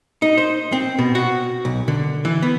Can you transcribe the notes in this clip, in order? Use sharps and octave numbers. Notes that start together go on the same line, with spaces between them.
D#4
C5
C4
B2
F#4
B1
D3
E3
B3